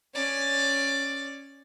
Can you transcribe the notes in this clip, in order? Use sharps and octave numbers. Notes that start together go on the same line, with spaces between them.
C#4 D5